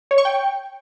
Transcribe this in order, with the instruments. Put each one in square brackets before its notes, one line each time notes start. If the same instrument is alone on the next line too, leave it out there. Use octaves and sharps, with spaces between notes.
[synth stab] C#5
C#6
G5